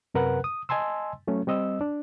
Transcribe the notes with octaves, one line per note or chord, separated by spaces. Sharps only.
F#2 C3 A#4 B4 F#5 F#6
D#6
D#5 G#5 A5 C6 E6
F#3 A3 C#4
G3 C4 D#5 E6
D4